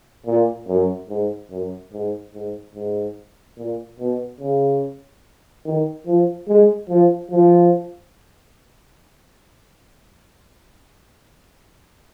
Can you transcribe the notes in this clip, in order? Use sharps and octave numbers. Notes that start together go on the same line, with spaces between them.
A#2
F#2
G#2
F#2
G#2
G#2
G#2
A#2
B2
C#3
D#3
F3
G#3
F3
F3